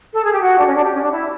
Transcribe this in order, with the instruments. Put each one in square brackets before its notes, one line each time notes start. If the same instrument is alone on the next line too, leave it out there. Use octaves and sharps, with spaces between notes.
[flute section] A4
G#4
G4
F#4
D4
C#4
D4
G4
C#4
D4
E4